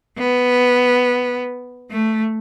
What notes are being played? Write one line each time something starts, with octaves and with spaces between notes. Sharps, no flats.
B3
A3